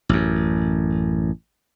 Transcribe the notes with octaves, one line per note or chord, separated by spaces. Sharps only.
A1 F#2